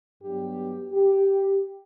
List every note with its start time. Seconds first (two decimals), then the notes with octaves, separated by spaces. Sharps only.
0.22 G2 F#3 B3 G4
0.93 G4